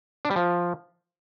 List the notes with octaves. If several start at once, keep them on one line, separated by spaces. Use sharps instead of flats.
D4
G3
F3